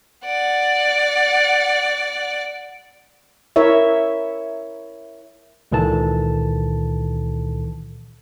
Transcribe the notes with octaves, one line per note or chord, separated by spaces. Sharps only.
D5 F#5
E4 A#4 C#5 E5
C#2 A#2 D#3 E3 A4 A5